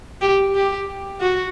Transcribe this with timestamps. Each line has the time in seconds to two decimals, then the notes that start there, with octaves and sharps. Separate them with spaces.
0.21 G4
0.55 G4
1.21 F#4